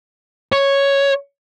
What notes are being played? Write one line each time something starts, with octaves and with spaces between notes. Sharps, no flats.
C#5